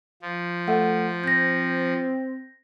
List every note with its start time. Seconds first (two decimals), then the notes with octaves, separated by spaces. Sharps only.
0.22 F3
0.68 A3 F#5
1.24 C4 G6 A#6